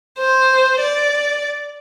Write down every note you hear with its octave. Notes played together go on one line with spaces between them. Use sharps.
C5
D5